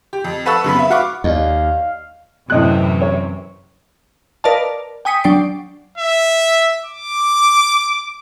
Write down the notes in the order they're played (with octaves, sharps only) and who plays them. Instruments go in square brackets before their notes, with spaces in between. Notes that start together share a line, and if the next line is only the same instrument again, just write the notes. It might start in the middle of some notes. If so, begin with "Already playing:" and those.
[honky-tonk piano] G4
F2
A4 B4 F#5 A5 C#6 E6
F#2 C#3 B3 B5
B4 E5
F#4 F5 F#5 B5 C#6 D6
[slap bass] D#2 [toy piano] D5 D#5 [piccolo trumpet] F5
[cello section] F#2 C3 E3 [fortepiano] A2 D#5 F#6
[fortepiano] C#5
[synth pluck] A#4 B4 D5 D#5 F5 A5
G5 G#5 D#6 B6 C#7
F#3 D4 D5 G5 C7 D7
[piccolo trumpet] E5
D6